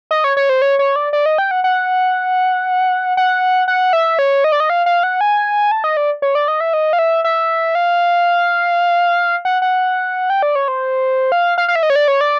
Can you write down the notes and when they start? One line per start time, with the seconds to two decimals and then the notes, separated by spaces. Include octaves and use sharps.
0.11 D#5
0.24 C#5
0.37 C#5
0.49 C5
0.62 C#5
0.79 C#5
0.96 D5
1.13 D5
1.26 D#5
1.38 G5
1.51 F#5
1.64 F#5
3.17 F#5
3.68 F#5
3.93 E5
4.19 C#5
4.44 D#5
4.52 D5
4.60 D#5
4.70 F5
4.86 F5
5.03 F#5
5.21 G#5
5.71 A5
5.84 D#5
5.97 D5
6.22 C#5
6.35 D5
6.48 D#5
6.60 E5
6.74 D#5
6.93 F5
6.99 E5
7.24 E5
7.75 F5
9.45 F#5
9.62 F#5
10.30 G5
10.42 D5
10.55 C#5
10.68 C5
11.32 F5
11.58 F5
11.68 F5
11.76 E5
11.83 D#5
11.90 C#5
11.96 D5
12.08 C#5
12.21 D5